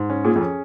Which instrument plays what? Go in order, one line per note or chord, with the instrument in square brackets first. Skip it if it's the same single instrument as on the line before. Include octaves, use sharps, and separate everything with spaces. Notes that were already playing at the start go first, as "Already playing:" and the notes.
Already playing: [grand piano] G#2
C#4
[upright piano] A#2 [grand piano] G#4
[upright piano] F2
[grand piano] C#4